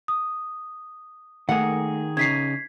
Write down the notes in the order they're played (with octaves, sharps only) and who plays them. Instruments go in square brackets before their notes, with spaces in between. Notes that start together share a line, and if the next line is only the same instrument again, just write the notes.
[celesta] D#6
[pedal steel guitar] D#3 G#4 [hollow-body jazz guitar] A3 A#3 [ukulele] F#5
[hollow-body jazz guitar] C#3 D#4 [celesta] G#6 B6 C7